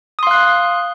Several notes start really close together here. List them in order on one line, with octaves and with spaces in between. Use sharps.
D#6 C6 F5 F#6